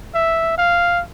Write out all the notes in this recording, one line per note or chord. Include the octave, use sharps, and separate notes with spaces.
E5
F5